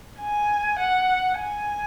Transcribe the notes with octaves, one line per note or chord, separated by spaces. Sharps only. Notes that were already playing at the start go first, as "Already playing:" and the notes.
G#5
F#5
G#5